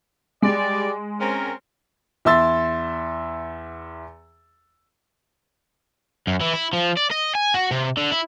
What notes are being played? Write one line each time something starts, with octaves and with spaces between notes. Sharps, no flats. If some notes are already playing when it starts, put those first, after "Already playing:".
G3 G#3 D5
C4 C#4 A#4
E2 E4 E5 C6 E6 A6
F#2
E3
E4
F3
D5
D#5
G#5
F#4
C3
D3
E4